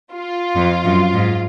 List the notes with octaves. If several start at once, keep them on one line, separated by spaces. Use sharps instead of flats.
F4
F2
F#2
G#2